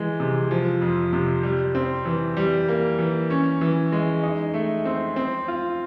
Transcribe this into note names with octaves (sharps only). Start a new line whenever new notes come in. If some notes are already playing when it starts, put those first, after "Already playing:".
Already playing: E3 G#3
C3
F3
F2
C3
G3
C4
E3
G3
A#3
E3
C#4
E3
G#3
D#4
A3
C4
C4
F4